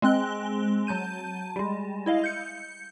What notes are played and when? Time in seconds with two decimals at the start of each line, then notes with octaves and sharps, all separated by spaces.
0.02 G#3 C4 F#6 G7
0.87 F#3 A5 G6 D#7
1.56 G3 G#3
2.06 E4 D#5 F5
2.24 G6 C#7